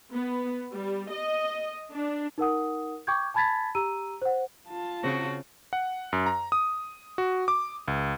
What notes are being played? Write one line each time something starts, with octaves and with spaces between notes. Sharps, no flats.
B3
G3
D#5
D4
D#4 A#4 F#5 D#6
G5 C#6 D6 G6 G#6
G#5 A5 B5 G#6 A6 B6
G4 A#5 E6 D#7
C5 F#5
F4 A5
C#3 C4 F#4
F#5
F#2
A#5
D#6
F#4
D6
C#2